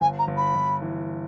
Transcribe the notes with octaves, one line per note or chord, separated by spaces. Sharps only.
G1 G#5
A#5
G1
B5
G1
E3